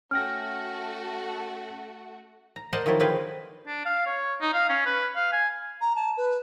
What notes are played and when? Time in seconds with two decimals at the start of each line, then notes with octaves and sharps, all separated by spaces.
0.11 A3 C#4 F#4 G5 F6 A#6
2.56 A#5
2.73 A#4 C5 D5 D#5 F#5 A5
2.86 D#3 F3 F#3 E4 A4
3.00 D3 C4 G#4 B4 F5 G5
3.67 D4
3.85 F5
4.06 C#5
4.41 D#4
4.53 F5
4.69 C#4
4.86 B4
5.16 F5
5.33 G#5
5.81 A#5
5.96 A5
6.17 B4